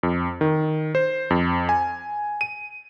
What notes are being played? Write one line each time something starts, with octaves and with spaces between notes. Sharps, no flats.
F2
D#3
C5
F2
G#5
D#7